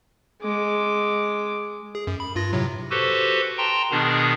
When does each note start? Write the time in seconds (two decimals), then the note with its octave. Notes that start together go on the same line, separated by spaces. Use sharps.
0.42 G#3 D6
1.95 G#4
2.07 F#2
2.20 B5
2.35 G2 F4 A#6
2.53 A2 C3 F#3
2.90 F#4 G4 A4 B4 C5
3.58 G5 A5 A#5 C6
3.91 B2 D#3 B3 D4 G#4